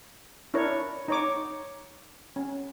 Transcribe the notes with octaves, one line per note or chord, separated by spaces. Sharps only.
D4 E4 A#4 C#5
D#4 C#5 D6
C#4